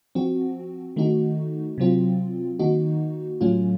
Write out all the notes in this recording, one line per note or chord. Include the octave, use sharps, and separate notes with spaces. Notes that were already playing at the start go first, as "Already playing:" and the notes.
F3 C4 F#4
D#3 A3 D#4 F#4
C3 F#3 C4 F4
D#3 A#3 D#4 F#4
A2 F#3 A3 C#4 F4